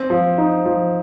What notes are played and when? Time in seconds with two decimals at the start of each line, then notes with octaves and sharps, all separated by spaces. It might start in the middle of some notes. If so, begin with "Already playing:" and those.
Already playing: C4
0.10 F3
0.38 D#4
0.66 F3